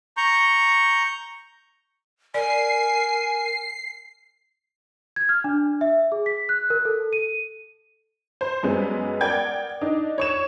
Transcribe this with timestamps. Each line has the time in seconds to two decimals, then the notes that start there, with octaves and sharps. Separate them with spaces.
0.17 A#5 C#6 G6
2.34 A#4 D5 G#5 C7
5.16 G#6
5.29 F6
5.44 D4
5.81 E5
6.12 G#4
6.26 B6
6.49 F#6
6.70 A#4
6.85 A4
7.13 D#7
8.41 C5
8.63 F#2 G3 G#3 B3
9.21 A#4 D5 F#5 G5 G#6
9.81 D4 D#4
10.18 C#5 C#6 E7